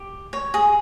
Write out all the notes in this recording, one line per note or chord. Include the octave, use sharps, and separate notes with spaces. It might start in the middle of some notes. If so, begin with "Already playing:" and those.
Already playing: G4
C#5
G#4